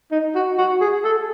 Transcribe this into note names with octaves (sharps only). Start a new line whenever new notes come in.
D#4
F#4
F#4
G#4
A4